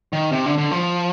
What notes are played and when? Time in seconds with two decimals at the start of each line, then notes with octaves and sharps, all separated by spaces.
0.13 D#3
0.32 C3
0.46 D3
0.58 D3
0.71 F3